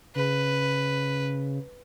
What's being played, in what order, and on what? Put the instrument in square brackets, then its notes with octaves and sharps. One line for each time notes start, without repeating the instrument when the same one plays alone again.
[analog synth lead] C#3 [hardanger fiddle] B4